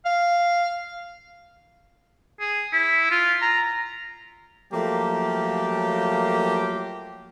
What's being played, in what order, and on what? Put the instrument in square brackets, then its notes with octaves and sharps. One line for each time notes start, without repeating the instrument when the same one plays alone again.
[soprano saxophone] F5
[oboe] G#4
E4
F4
A#5
[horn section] F3 F#3 A3 A#3 G4